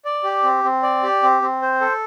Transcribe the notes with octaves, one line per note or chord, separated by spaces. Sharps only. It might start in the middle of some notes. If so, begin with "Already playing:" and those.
D5
G4
C4
C4
D5
G4
C4
C4
C5
A4